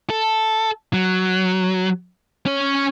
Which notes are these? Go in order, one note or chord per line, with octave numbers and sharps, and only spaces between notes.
A4
F#3
C#4 C#5